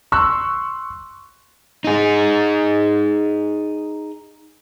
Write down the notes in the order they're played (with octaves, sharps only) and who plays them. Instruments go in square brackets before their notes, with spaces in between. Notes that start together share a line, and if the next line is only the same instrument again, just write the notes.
[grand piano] C6 C#6 E6 F#6
[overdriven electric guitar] D#4 G#4